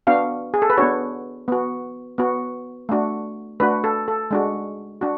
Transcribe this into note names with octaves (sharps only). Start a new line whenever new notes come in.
B3 D4 F#4 F5
G#4
A4
B4
B3 D4 F#4 C#5
B3 F#4
B3 F#4
A3 D4 F#4
A3 D4 F#4 B4
A4
A4
G#3 D4 F#4
D4 F#4